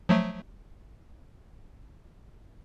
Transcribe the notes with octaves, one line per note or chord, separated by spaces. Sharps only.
F3 F#3 A3